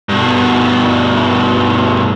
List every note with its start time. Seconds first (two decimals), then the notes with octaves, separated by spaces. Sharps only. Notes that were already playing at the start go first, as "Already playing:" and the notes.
0.09 G2 B2